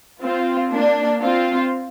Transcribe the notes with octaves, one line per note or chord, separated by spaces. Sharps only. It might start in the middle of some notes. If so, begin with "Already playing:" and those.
C4 F4
A#3 D4
C4 F4